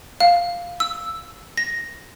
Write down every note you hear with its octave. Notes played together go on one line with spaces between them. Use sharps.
F5
E6
A#6